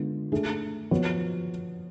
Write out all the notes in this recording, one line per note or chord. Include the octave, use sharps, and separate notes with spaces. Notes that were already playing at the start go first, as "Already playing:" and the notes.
Already playing: D3 G#3 B3 F4
A3 D4 G#4
F3 B3 F#4 C#5